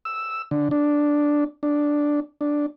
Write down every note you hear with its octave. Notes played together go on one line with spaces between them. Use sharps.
E6
D3
D4
D4
D4